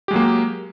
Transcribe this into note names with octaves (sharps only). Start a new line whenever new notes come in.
F#3 G#3 A#3 G4